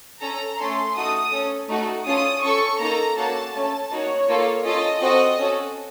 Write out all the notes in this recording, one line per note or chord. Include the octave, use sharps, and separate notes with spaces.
C#4 A4 A#5
A3 C#4 A4 C6
A3 D#4 F#4 A4 D#6
C#4 A4
A3 D#4 F#4 A4
C#4 F4 A4 D#6
C#4 A4 C#6
A#3 D#4 A4 A#5
A#3 C#4 F#4 A4 A5
A3 C#4 A4 A5
A#3 D#4 F#4 C#5
A#3 F4 A4
C#4 F4 A4 D#5
C4 F#4 A4 D#5
C#4 F#4 A4